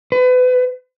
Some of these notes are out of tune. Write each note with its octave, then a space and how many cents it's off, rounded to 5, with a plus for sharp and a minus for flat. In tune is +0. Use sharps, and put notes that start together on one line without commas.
B4 +30